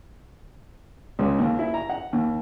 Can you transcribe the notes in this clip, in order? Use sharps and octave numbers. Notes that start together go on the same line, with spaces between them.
C#2
D#2
E4
A#5
F#5
D#2